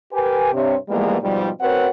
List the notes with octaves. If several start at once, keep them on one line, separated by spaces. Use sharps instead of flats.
G4 A#4 B4 G#5
G2 C3 C#5
E3 F3 G3 G#3 A#3 B3
G#2 B2 F3 G3
C4 F#4 A#4 B4 C#5 F#5